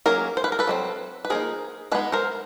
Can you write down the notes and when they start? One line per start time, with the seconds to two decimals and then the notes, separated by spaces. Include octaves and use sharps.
0.06 F#3 A#3 C#4 G#4 A#4
0.37 C5
0.44 B4
0.52 A#4
0.59 A4 B4
0.67 F#3 A3 C4
1.25 B4
1.30 F3 A#3 D#4 G#4 A#4
1.92 G#3 B3 D#4 A4 B4
2.12 A#4 C5